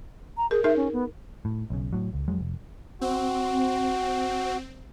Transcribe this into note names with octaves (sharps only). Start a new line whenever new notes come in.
A#5
G#4 A#4
D#4 G#4 A#4 E5
C#4
B3
A2
B1 C#3
A2 F#3
C#2
F2 F#3 G#3
F1
C4 F#4